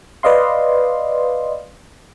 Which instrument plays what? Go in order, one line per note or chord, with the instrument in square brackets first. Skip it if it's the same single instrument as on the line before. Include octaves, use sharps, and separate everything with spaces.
[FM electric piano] B4 D5 D#5 F5 C6